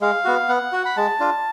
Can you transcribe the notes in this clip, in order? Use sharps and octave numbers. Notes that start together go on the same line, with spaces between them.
G#3 F5
B3 F#4
B3 F#5
F#4
B5
G#3 A5
D4 F4